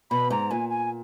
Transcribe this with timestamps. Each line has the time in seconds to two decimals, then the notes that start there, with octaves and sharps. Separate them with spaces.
0.11 B2 B5
0.30 G#2 A#5
0.51 A#2 G#5
0.70 G#5